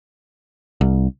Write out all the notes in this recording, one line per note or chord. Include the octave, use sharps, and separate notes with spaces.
C2